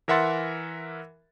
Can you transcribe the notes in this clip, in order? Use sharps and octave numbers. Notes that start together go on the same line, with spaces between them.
E3 A#4 E5 F#5 C6 A6